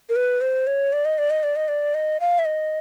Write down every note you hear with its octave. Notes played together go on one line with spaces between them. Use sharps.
A#4
B4
C5
C#5
D5
D#5
D5
D#5
D5
D#5
D5
D#5
F5
E5
D#5